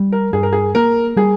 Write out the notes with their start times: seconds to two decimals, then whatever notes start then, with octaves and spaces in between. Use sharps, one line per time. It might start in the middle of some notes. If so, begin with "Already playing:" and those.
Already playing: G3
0.12 A#4
0.33 G2 G#4
0.43 A#4
0.53 G#4
0.75 A#3 A#4
1.17 G3 G#4